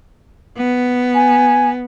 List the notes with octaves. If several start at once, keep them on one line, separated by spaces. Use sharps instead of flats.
B3
G#5